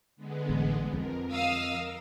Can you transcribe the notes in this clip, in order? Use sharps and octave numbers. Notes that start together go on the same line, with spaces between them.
D3 G#3 B3
A1
F2 A#4
D#5 F5 D#6 E6
A#4